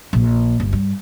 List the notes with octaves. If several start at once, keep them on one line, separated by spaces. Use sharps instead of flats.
A#1
G1
G2